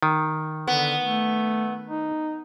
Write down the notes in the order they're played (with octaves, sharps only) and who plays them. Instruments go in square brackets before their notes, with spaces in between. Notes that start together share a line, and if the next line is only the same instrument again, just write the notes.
[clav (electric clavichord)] D#3
[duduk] D3 [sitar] B3
[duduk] A3
D#4